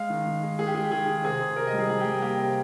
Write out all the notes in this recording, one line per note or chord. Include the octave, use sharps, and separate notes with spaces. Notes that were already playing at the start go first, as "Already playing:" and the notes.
Already playing: G#3 F5
D#3
D#3
G#3
G#3 G#4
G4
G#3 G#4
G4
D#3 G#4
D#3
C3 G#4
C3
C3 A#4
D#5
G3
G#4
G3 G#4
G4
G3
A#3 G4
C3